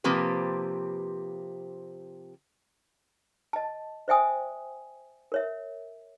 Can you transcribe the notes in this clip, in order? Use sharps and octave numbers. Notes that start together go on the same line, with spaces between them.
C3 F3 A#3 C4 G4 B4
D#5 A5
C5 D5 E5 G5 G#5 D#6
A#4 C#5 E5